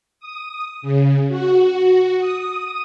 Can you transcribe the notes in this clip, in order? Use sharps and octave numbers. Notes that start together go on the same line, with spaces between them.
D#6
C#3
F#4
D#6